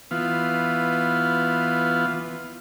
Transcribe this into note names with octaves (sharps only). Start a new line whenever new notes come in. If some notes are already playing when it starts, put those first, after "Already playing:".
E3 B3 F4